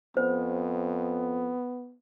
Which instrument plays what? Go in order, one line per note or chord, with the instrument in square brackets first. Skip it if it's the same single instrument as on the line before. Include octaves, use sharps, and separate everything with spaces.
[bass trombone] F2 [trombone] B3 [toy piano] C5